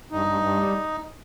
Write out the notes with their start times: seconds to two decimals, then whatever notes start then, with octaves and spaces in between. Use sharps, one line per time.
0.12 G2 D#4
0.26 G2
0.41 G2
0.57 G3